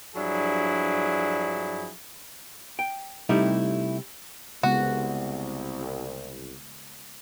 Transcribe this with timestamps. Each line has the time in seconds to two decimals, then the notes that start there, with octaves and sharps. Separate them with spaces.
0.16 G2 F3 F#3 D4 E4 G#4
2.79 G5
3.29 C3 G3 A3 D#4 E4
4.63 C2 C#3 G#3 B3 F#4